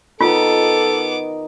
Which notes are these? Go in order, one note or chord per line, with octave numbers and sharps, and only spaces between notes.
D#3 B3 D#4 F4 A4 D6